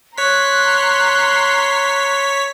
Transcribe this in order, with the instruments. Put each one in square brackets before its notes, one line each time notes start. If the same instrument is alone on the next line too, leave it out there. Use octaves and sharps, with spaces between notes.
[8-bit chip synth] C#5 B6 [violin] A#5 C6 [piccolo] F#6